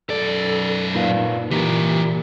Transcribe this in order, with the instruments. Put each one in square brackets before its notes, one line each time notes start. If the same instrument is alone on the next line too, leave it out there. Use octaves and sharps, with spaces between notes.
[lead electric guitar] F#2 D5 [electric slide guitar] A4
[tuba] A#2 [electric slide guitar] D#4 B4 F5
[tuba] A#2 [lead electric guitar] E3 A#4 [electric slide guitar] G4